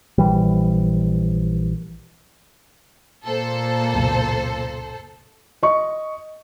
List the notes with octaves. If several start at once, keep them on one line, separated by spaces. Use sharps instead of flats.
A#1 E3 G3
A#2 A#3 A4 C5
C#2 F#2 B2
D#5 C#6